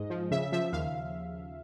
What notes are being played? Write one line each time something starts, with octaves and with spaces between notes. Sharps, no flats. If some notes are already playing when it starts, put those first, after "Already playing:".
Already playing: G#2 G#3 D#5
F3
C#3 E5
F3 E5
D#2 F5